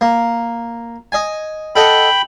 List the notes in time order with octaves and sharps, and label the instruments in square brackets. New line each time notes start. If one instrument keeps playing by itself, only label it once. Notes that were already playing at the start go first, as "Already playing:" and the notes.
[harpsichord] A#3
D#5 G#5
[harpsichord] A4 D#5 F#5 [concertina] G5 B5